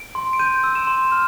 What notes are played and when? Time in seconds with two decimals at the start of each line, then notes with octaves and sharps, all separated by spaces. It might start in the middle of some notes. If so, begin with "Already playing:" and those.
Already playing: D7
0.15 C6
0.33 D7
0.39 G6 D#7
0.64 E6
0.75 E7
0.87 C6
1.12 F6